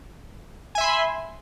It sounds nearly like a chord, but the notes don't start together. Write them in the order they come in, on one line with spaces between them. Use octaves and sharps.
G#5 E5 C6 B5